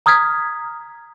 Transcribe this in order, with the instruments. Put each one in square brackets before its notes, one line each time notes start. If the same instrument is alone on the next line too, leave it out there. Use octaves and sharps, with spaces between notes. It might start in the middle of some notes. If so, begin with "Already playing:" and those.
[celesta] A#5 D#6 F6 G#6 B6